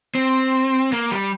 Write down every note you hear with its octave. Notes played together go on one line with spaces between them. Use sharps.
C4
A#3
G3